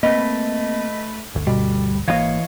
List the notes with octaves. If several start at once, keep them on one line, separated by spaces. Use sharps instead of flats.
A3 A#3 C4 B4 D#5
G1 D2
B2 G3
G#1 D#3 E3 A#3 C#5 D#5 F5